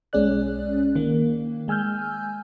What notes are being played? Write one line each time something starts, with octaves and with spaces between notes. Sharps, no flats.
B1 G#3 C#4 G#4 D5 F#6
D#3 A#3
G#3 G#5 E6 F6 G6